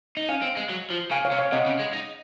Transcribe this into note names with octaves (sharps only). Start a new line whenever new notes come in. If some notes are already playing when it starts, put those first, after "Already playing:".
D#4
C#4 F5 G#5
C4
G#3
F#3
F3
C#3 F5 G#5
C#5 F5
C3
C#5 F5
C3 D#5 F#5
C#3
G#3
D#4